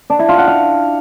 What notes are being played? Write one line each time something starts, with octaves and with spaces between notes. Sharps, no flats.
D4
E4
F4
F#5
F5